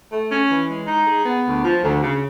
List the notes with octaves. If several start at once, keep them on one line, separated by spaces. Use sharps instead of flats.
A3
C#4
E3
G#3
D#4
G#4
B3
D2
F3
D2
C#3